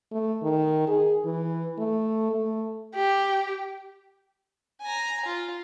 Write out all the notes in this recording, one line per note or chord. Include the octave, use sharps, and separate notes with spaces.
A3
D#3
G#4
E3
A3
A3
G4
G#5 A#5
F4